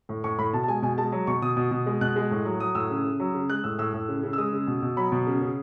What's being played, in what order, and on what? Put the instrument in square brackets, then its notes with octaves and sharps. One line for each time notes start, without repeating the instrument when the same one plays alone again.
[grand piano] A2
A2 C#6
A2 B5
B2 A5
A5
G#3 G#5
B2 G#5
G#3 A5
F#3
B2 C#6
B2 D#6
B2
B2
G#3
B2 F#6
G#3
A2
F#3
F#3 D#6
A2 E6
C#3
C#3
F#3
C#3
G#3 F#6
A2 E6
A2 E6
A2
C#3
C#3
E6
G#3 D#6
C#3
B2
B2
F#3 B5
B2
C#3
C#3